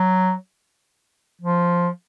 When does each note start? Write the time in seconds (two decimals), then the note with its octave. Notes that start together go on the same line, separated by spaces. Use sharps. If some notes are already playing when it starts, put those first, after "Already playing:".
Already playing: F#3
1.42 F3